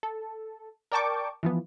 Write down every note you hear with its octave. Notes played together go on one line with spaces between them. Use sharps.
A4
A#4 D5 G5 A5 C#6 D6
E3 F3 B3